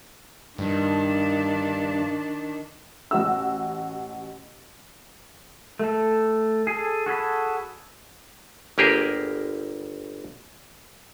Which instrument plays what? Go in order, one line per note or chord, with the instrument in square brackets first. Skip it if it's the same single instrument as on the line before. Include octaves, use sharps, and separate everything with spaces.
[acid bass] G2 [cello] D#3 D4
[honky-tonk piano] A1 F#4 E6
[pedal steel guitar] A3 A4
G#4 A4
F#4 G#4 A4 B5
[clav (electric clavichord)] G1 A#3 G4 G#4 A#4